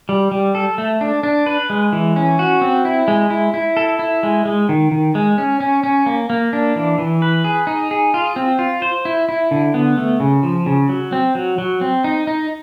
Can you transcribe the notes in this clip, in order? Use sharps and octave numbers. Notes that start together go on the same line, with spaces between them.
G3
G3
A4
A3
D4
D4
B4
G#3
E3
C#4
F#4
C4
E4
G#3
E4
E4
A4
E4
G#3
G#3
D#3
D#3
G#3
C#4
C#4
C#4
A#3
A#3
D4
E3
E3
B4
G#4
D#4
G#4
F4
C4
F4
C5
E4
E4
D3
B3
A3
C#3
F3
C#3
F#3
C4
F#3
F#3
C4
D#4
D#4